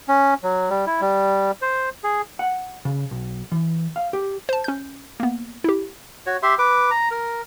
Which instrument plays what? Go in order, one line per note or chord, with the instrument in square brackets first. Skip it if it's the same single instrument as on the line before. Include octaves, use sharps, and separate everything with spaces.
[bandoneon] C#4
F#3
G3
E4
G3
C5
G#4
[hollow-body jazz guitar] F#5
C#3
B1
E3
F5
G4
[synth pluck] C5 A5
C#4 G6
A#3 B3
E4 G4
[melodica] F#4 C#5
G4 E5 C6
B4 D6
A#5
A#4